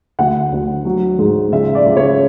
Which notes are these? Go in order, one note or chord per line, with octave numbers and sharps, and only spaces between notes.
D2 F#5
D2
F#3
G#2
C#2 E5
D5
C#2
C#5